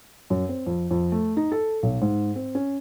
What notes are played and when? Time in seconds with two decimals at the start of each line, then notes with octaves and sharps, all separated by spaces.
0.30 F#2
0.49 C4
0.66 F2
0.91 F2
1.12 A3
1.37 D#4
1.52 A4
1.83 B1
2.02 G#2
2.36 C4
2.55 C#4